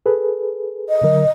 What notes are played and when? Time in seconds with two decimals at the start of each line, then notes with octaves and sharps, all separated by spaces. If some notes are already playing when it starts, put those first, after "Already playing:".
0.06 G#4 A4 B4
0.89 D#5
1.03 D3 F#3 A#4